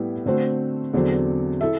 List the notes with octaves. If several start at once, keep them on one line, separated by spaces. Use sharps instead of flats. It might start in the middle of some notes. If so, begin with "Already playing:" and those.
Already playing: A2 G3 B3 E4
D3 A3 C4 F#4 C5
E2 D3 F#3 C4
E4 A4 E5